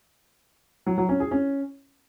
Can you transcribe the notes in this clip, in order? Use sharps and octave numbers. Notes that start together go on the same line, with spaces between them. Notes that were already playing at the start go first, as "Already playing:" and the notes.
F#3
F#3
C#4
G#4
C#4